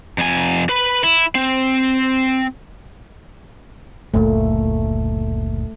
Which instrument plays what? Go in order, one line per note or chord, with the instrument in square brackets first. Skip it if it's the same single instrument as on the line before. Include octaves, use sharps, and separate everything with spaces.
[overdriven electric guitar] F2 G#5
B4 B5
E4
C4
[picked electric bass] F#1 D2 A#2 [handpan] A3